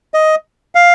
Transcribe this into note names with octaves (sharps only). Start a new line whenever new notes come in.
D#5
F5